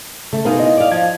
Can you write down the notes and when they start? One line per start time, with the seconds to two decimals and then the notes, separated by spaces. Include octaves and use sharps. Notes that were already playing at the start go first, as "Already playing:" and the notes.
0.33 C#3 A3
0.45 B2 G#3 D#4 A#4 F5
0.59 E4 D#5
0.77 D5 F5
0.91 F3 G#6